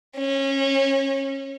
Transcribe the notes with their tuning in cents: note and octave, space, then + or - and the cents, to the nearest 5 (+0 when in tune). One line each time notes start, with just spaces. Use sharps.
C#4 -25